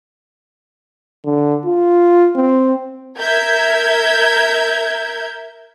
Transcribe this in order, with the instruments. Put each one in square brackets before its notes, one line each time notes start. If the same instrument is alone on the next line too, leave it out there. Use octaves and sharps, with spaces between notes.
[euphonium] D3
F4
C4
[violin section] A#4 E5 G6 G#6